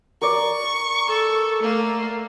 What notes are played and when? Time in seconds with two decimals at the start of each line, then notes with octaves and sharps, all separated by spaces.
0.21 A#4 D5 C#6
1.08 A4
1.63 A3 A#3